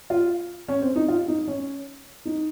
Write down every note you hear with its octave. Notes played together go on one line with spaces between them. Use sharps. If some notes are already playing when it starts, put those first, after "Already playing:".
F4
C#4
C4
D#4
F4
D#4
C#4
D#4